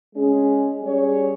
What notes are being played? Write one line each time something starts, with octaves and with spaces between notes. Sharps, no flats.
G#3 C#4 G#4
G3 C#4 G#4 C#5